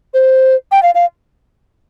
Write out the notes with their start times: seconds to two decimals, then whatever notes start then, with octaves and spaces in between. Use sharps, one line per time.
0.14 C5
0.72 G5
0.83 F5
0.95 F5